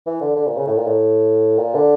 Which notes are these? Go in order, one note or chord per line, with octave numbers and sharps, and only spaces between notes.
E3
D3
D3
A#2
C#3
A2
A#2
A2
A#2
D3